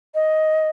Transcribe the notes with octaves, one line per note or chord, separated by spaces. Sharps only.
D#5